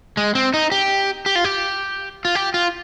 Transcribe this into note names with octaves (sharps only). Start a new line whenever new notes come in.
G#3
C4
D#4
G4
G4
F4
G4
F4
G4
F4